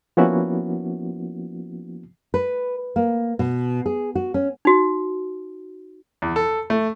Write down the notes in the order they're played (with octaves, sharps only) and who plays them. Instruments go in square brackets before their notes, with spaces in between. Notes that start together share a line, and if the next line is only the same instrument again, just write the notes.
[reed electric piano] F3 A#3 B3 C#4 E4 F#4
[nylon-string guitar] B4
A#3
B2
G#4
F#4
C#4
[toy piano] D#4 F#4
[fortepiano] E2
A4
A3